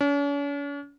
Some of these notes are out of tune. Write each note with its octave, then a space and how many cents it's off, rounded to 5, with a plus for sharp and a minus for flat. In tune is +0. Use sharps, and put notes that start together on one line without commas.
C#4 +45